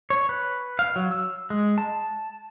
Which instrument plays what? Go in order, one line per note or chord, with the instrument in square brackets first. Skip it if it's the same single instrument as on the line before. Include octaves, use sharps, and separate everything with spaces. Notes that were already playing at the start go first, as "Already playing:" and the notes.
[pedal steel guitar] C#5
B4
F5
F#3
E6
G#3
A5